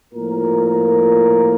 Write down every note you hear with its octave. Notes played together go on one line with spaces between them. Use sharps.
A2 F3 A#3 F4 A#4